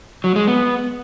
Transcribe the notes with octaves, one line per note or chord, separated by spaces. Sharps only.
F#3
G#3
B3